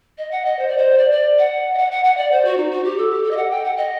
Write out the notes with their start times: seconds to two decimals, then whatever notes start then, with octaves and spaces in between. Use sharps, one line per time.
0.18 D#5
0.31 F#5
0.45 D#5
0.59 C5
0.68 D5
0.77 C5
0.98 D5
1.12 D5
1.39 F#5
1.74 D#5
1.78 F#5
1.92 F#5
2.05 F#5
2.17 D5
2.32 C5
2.45 F#4
2.57 D#4
2.71 F#4
2.84 G4
2.98 A4
3.11 G4
3.23 A4
3.31 D#5
3.37 F#5
3.51 G5
3.65 F#5
3.77 D#5